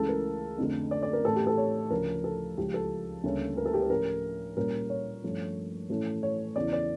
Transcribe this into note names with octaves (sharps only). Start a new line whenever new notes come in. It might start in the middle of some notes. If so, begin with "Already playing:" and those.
Already playing: C#2 C#3 E3 A3 A4
A#4
F2 D3 A3
D5
D5
A#4
A2 E3 A3 C#4 A4
G4
A4
C#5
D2 C#3 F3 A#4
A4
C#2 C#3 F3 G4
A4
D2 C#3 G3 A#3 C#4
A#4
A4
G4
A4
A2 F3 C#4 A#4
A#2 G3 C#4 A#4
C#5
G2 F3 A3 C#4
A2 E3 A3 C#4
C#5
E2 C#3 E3 A3 D5
D5